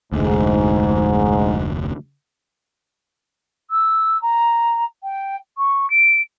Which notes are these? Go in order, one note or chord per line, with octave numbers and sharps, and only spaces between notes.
F1 D2 G#2
E6
A#5
G5
C#6
D7